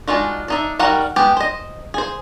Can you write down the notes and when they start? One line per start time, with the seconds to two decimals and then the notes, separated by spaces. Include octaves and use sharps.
0.08 G#3 D4 D#4 F4 F#4
0.48 D4 D#4 E5
0.79 G3 D#4 F#4 A#4 F#5
1.16 G#3 B3 G4
1.37 C5 D#5
1.94 G#4 C5